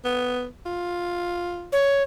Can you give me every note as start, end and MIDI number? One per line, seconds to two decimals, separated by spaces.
0.05 0.47 59
0.66 1.71 65
1.73 2.03 73